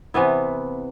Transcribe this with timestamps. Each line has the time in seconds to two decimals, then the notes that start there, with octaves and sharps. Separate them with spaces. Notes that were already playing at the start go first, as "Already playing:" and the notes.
0.14 C3 E3 B3 E4